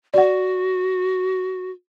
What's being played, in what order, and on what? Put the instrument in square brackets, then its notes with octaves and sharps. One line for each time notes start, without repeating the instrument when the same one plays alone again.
[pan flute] F#4 [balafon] D5 F#5